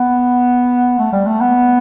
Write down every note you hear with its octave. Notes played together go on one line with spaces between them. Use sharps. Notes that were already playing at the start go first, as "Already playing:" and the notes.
Already playing: B3
A3
G3
A3
B3